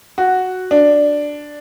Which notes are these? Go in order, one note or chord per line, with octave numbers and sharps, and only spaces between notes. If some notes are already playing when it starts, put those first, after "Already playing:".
F#4
D4